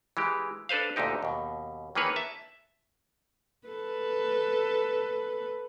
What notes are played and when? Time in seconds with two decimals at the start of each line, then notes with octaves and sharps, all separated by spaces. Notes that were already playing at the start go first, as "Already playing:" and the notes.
0.17 E3 G#3 G4
0.69 D4 A4 B4 C5 F5
0.96 D2 A#2 D3 D#4 G4
1.22 D#2 B2
1.95 D#3 E3 A#3 G#4 B4 C#5
2.16 E5 A5
3.68 A4 B4